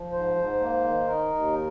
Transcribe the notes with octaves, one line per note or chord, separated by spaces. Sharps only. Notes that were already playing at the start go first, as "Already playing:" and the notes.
Already playing: F3
G#2 C5
G#2
A#3
D#3
D#4 A#4
D#2